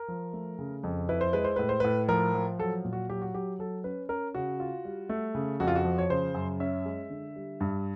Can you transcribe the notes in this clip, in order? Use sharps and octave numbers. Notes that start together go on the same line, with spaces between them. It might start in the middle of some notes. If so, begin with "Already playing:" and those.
Already playing: A#4
F3
A3
C#3
F2
E4 B4
C5
G#3 B4
C5
A2 B4
C5
A2 B4
F3 A#4
F3
F#3 A4
A#2
F#4
F#3 G4
F#4
F#3 G4
F#3 A4
C#4 B4
C#4 A#4
C#3 F#4
F4
G3
A3
C#3
F2 F#4
F4
F#4
F3
C#5
C#3 C5
F#2
C#4 E5
G#3
D3
G3
G2